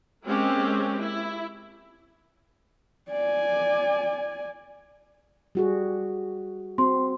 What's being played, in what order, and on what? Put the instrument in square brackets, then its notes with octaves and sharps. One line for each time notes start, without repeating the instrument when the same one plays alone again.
[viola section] G#3 A#3 C4 C#4 G4
E4
[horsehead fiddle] D5 G#5
[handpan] G3 F#4 G#4
[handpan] C4 F#4 [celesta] C6